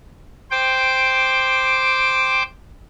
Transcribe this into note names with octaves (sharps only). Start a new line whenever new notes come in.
C5 G5 D6